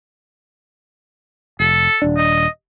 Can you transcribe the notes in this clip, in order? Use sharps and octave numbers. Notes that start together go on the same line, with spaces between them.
F1 A4
D#1 D4
D#5